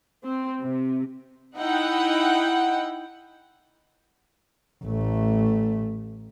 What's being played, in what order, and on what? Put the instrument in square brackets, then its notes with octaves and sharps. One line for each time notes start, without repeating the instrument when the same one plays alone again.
[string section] C4
C3
D#4 E4 F#5 G5
[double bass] A1 A3